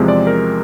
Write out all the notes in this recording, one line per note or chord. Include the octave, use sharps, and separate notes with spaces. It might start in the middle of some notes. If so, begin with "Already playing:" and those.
Already playing: E2 C3 F3 G#3 C4
D5
A#4